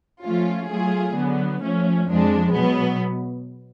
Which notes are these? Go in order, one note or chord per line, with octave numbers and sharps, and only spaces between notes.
F3 A3 C#4 F4
F#3 A3 F4 G#4
D3 F#3 B3
F3 A3 C#4
F2 F3 G#3 D4
B2 F#3 B3